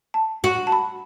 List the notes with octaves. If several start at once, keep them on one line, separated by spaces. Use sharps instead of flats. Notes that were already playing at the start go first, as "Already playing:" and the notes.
A5
F#4
A5
B5